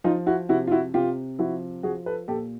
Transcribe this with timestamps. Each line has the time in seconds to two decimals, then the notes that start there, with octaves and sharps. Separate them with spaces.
0.04 F3 D#4 F4
0.26 E4 F#4
0.49 C3 E4 F#4
0.67 F4
0.72 E4 F#4
0.94 C3 F4 G4
1.39 F3 E4 F#4
1.83 F3 F#4 G#4
2.06 A4 B4
2.28 A#2 G4 A4